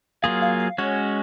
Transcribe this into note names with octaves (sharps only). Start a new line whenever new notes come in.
F#3 A#3 F4 G#4 F5
F5
F5
G#3 C#4 F#4 C#5